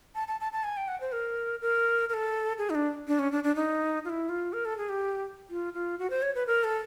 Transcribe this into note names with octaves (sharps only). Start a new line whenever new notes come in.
A5
A5
A5
A5
G#5
G5
F#5
C5
A#4
A#4
A#4
A4
G#4
D#4
D4
D4
C#4
D4
D4
D#4
F4
E4
F4
A#4
A4
G#4
G4
F4
F4
F#4
C5
C#5
B4
A#4
A4